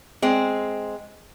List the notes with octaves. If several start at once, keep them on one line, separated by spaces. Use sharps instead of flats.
G#3 C4